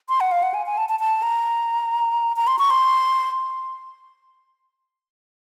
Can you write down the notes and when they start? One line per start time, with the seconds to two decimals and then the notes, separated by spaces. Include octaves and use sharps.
0.09 C6
0.20 F#5
0.32 F5
0.43 F#5
0.54 G#5
0.66 G#5
0.78 A5
0.89 A5
1.00 A5
1.23 A#5
2.36 A#5
2.47 C6
2.59 C#6
2.70 C6